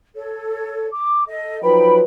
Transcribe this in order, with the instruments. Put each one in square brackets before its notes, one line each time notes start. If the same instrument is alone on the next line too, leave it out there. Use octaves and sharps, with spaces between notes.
[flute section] A4 C#5
D6
A4 D#5
[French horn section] F3 F#3 B4 [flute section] D#4 G5 B5